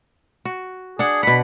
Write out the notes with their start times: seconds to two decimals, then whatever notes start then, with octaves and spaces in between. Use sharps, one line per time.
0.45 F#4
0.99 D4 G#4 F#5
1.23 B2 F#5 B5